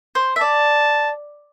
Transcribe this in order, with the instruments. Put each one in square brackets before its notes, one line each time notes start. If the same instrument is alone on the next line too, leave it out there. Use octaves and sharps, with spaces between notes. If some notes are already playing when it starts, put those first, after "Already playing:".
[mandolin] C5
E5
[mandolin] D5 [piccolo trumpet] A5